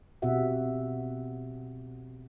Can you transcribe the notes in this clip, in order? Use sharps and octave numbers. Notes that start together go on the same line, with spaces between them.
B2 C4 F#4 G4 E5 F#5